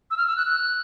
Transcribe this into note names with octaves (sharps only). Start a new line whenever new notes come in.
E6
F6
E6
F#6
F#6